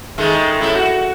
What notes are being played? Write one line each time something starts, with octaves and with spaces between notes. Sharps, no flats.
D#3 G#3 A3
A2 A3 E4
F#4